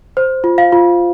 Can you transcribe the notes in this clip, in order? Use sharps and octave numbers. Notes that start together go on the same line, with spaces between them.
C5
F4
F5
F4